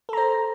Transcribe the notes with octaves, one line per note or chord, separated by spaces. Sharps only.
A4 C5 A#5